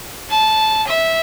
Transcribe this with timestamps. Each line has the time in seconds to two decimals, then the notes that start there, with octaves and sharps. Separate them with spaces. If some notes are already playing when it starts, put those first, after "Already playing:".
0.30 A5
0.87 E5